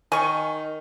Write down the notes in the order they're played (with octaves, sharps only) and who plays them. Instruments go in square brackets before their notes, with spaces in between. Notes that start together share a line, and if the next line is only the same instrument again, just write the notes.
[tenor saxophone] D#3 [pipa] G#5 C#6